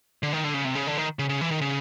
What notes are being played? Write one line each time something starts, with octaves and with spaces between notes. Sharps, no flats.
D3
D#3
D3
C#3
C3
C#3
D3
D#3
C#3
C#3
E3
D#3
C#3